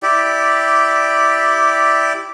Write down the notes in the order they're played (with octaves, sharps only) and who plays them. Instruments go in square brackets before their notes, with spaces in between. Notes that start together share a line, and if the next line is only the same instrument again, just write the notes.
[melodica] E4 G4 D5